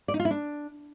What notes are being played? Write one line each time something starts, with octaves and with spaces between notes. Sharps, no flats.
D5
D#4
F4
E4
D4